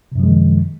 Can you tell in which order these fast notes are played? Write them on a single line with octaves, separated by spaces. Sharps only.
C3 F#2 F3 G#3 D#3